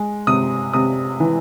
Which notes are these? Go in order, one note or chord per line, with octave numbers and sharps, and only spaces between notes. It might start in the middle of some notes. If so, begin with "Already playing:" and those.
Already playing: G#3
C3 D#6
C3 D#6
E3